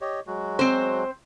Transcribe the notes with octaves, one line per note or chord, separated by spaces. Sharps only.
G4 C#5 D#5
F#3 G#3 F#4
C4 C5